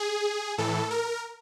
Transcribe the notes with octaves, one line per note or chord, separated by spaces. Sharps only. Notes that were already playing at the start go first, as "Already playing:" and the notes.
Already playing: G#4
A2 E3 A4
A#4